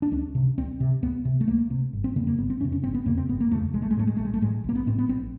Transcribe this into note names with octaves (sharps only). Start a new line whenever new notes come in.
D4
C#2 C#4
C3
C#2 C4
C3
C#2 B3
C3
A3
C#2 A#3
C3
G1
C4
F2 C#3 A#3
A#3
G1 B3
C4
F2 C#3 C#4
C#4
G1 C4
B3
F2 C#3 A#3
C4
G1 B3
A#3
F2 C#3 A3
A#1 G#3
A3
G#3
A2 A3
G#3
A#1 A3
G#3
A3
A2 G#3
A#1 A#3
B3
A2 C4
B3
A#1 C4